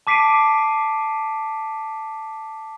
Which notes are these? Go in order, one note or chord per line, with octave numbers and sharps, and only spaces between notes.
A5 D6 B6 C7 D7 D#7